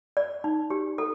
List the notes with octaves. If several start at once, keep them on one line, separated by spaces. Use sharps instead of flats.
D5
D#4
G4
A4